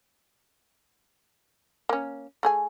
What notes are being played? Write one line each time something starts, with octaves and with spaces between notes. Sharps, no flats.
A#3 C#4
A3 G#4 G#5